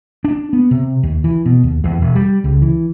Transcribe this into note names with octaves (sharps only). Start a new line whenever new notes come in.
D4
B3
C3
D#2
E3
B2
D#2
E2
E1
G3
C#2
E3